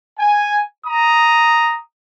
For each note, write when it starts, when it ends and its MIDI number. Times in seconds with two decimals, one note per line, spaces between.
0.19 0.60 80
0.85 1.76 82
0.85 1.76 87